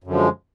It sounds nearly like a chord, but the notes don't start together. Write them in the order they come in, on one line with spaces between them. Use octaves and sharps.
F#2 D3 F3 G#3